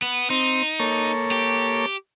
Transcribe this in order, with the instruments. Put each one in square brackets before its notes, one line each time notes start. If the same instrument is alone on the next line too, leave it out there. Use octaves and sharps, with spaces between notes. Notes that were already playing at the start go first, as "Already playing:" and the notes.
[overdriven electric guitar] B3
[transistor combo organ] C4 [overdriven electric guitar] D#4
[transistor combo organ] A#3 A4 C#5
[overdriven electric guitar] G4